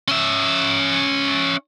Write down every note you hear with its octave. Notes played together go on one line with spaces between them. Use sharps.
C#4 E5